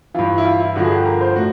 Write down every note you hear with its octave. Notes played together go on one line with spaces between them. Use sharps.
G2 E3 F4
E4
F4
E4
G2 D3 F3 F#4
G#4
G4
A#4
C5
A2 F#4